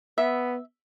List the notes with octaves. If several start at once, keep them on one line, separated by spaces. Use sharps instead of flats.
B3 E5